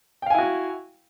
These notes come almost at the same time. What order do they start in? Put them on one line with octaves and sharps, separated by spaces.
G5 F5 G#5 E4 F#4